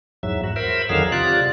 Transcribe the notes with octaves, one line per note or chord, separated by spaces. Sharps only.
E2 G#2 F#3 E5
F#4
A#4 C5 E5 B5
F2 D3 D#3 F#3 G#4 F5
C3 F4 D5 F#6